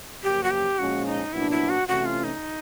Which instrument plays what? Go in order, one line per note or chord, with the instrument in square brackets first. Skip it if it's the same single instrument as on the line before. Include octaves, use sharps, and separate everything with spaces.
[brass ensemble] F#2 C#3 F3 A#3 [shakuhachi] G4
[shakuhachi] F#4
G4
[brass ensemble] A#2 F3 G#3 C#4 [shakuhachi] F#4
[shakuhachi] D#4
[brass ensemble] C2 A#2 F#3 B3 D4 [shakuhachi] E4
[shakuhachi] E4
F#4
[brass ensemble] C3 E3 A3 C#4 [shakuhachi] F#4
[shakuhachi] F4
D#4